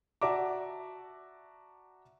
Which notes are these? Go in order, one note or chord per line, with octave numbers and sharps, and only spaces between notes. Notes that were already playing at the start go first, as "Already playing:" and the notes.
F#4 D5 E5 A5 A#5 D6